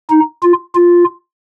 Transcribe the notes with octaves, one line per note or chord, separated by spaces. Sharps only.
D#4
F4
F4